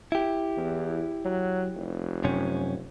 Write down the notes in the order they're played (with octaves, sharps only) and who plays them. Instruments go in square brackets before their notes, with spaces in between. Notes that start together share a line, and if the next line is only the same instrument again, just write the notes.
[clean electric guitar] E4 G4
[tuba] E2
F#3
F1
[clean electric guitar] F#2 C3 C#4